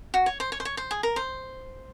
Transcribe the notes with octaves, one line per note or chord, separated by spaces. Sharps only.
F#4
C#5
C5
C#5
C5
C#5
C5
G#4
A#4
C5